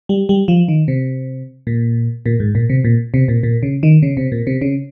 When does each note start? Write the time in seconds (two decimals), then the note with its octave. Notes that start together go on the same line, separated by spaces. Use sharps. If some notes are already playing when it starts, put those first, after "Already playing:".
0.09 G3
0.29 G3
0.48 F3
0.68 D#3
0.88 C3
1.67 A#2
2.26 A#2
2.40 G#2
2.55 A#2
2.70 C3
2.84 A#2
3.14 C3
3.28 A#2
3.43 A#2
3.63 C#3
3.83 D#3
4.03 C#3
4.17 C3
4.32 A#2
4.47 C3
4.61 C#3